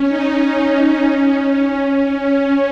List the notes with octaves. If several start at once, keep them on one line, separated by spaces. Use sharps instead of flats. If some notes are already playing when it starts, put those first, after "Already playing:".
Already playing: C#4
D#4
C#4
D#4
C#4
C#4